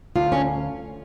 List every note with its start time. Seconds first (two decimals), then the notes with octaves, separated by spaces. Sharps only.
0.16 D2 F4
0.32 C#4